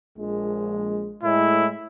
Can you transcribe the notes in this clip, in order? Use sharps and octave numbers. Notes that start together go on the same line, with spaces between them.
A#1 G#3
A2 G#3 E4